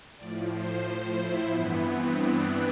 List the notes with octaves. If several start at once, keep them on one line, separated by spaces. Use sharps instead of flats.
A2 F3 D5
C5
E4
G2 E3 B3
C4
D4